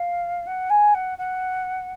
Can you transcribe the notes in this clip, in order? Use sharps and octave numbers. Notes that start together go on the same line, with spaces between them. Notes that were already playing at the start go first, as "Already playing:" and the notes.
Already playing: F5
F#5
G#5
F#5
F#5